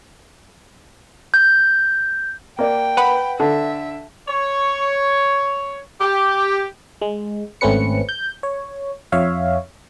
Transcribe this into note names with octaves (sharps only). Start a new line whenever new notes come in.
G6
A#3 D5 G5
B4 F#5 B5
D3 E5
C#5
G4
G#3
G#1 A3 C4 C#4 B4 C#7
G6
C#5
F2 C#5 E5 F5